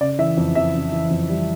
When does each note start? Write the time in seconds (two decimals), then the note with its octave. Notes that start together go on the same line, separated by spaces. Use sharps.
0.01 C#3 D5
0.19 E3 E5
0.37 F2
0.55 F2 E5
0.74 C#3
0.92 E3
1.10 F2
1.29 G3